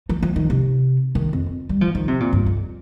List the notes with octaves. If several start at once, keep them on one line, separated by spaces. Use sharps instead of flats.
F3
F3
D#3
C3
D#3
F2
G3
F3
D#3
C3
A#2
G2
F2